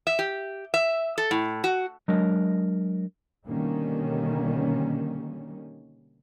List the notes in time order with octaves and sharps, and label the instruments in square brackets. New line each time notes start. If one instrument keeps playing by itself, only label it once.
[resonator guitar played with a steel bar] E5
G4
E5
A4
A2
F#4
[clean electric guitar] F#3 G#3 D4 A#4 D#5
[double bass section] B2 D3 D#3 G3 A#3 C#4